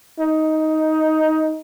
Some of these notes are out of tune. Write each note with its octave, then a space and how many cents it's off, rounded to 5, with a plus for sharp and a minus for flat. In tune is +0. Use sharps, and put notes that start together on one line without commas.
D#4 +10